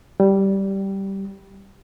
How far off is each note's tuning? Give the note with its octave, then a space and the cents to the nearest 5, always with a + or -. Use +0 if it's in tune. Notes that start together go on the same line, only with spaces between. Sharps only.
G3 -10